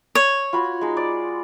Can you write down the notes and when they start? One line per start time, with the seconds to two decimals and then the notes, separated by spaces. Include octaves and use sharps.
0.15 C#5
0.53 F4 F#4 B5
0.81 G#3 D#4
0.97 D5